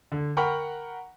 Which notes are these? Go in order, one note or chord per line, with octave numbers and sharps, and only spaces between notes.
D3
A#4 F#5 G5 A#5 B5 C#6